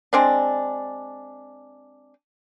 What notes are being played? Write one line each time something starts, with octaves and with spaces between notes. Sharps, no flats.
G#3 C4 D4